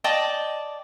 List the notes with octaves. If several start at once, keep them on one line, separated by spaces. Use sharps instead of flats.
D5 D#5 G5 A5